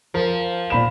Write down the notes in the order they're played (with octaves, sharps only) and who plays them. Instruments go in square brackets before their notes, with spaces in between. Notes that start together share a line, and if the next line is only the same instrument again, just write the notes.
[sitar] F3 [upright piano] A#4
[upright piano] A#2 B5 E7